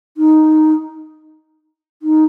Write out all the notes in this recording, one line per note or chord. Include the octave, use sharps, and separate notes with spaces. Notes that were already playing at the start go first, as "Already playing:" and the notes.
D#4
D#4